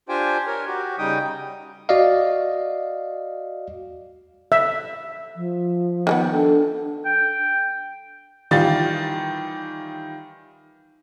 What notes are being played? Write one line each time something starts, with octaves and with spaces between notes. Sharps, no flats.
D4 F4 G4 C5 G5 G#5
A#4 C#5
F#4 G4
C#3 G3 D#4 G5 D#6
F#4 D5 D#5 F5
E5
F3
D#3 G#3 B3 G5
D4 A4
G5
D#3 E3 G3 F4 A6